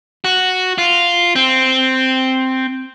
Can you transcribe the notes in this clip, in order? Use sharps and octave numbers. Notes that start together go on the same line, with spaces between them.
F#4
F4
C4